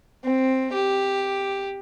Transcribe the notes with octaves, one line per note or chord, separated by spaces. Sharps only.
C4
G4